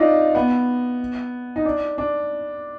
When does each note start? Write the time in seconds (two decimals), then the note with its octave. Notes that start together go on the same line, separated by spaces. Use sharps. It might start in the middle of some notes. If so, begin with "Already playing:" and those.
Already playing: D4 D#4 F4
0.35 B3
1.56 D#4
1.65 D4
1.98 D4